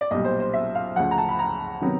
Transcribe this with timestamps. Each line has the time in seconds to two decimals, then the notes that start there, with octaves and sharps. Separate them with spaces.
0.01 D5
0.11 B1 A#2 G3 D#5
0.25 C5
0.40 C5
0.53 E5
0.75 F5
0.96 D2 C#3 F3 F#5
1.11 A#5
1.18 A5
1.29 B5
1.39 A#5
1.81 C3 D#3 F#3 B3